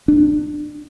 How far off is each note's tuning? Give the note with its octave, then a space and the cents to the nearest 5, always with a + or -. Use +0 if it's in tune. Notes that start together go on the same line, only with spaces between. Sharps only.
D4 +20